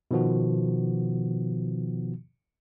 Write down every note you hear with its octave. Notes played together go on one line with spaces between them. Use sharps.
B2 D#3 F3 B3 F#4